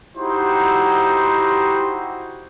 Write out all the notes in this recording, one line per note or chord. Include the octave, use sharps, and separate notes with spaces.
D#4 E4 F#4 G4 C5